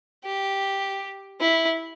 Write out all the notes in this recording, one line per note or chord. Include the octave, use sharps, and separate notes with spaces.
G4
E4